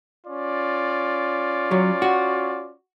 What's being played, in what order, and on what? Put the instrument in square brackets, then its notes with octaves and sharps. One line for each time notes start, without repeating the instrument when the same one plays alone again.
[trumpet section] C#4 F4 D5
[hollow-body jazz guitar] F#3
F#4